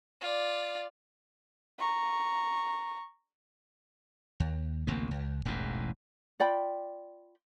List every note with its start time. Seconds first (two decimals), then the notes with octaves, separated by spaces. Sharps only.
0.21 F4 D5
1.79 A#5 C#6
4.40 D#2
4.87 A1 D2 C3 A#3
5.11 C#2
5.45 E1 A1 E2 G#2
6.40 F4 D5 G5 B5